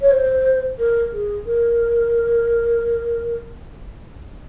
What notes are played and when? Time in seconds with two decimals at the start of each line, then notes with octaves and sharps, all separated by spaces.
0.01 C#5
0.11 C5
0.78 A#4
1.12 G#4
1.46 A#4